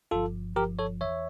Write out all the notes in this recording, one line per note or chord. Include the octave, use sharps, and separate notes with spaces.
G1 G2 F3 F4 A4
G1 G2 F3 G4 A#4
A4 C#5
E2 E3 C#5 E5